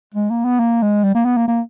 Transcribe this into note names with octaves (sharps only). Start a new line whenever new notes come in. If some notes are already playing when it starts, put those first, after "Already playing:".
G#3
A#3
B3
A#3
G#3
G3
A#3
B3
A#3
A#3